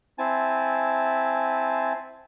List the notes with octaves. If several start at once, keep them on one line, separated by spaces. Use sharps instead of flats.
C4 E4 G#5 A5